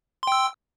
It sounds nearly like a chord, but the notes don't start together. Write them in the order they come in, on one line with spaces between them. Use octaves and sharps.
C6 G5 E6